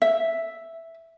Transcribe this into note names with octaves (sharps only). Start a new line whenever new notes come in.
E5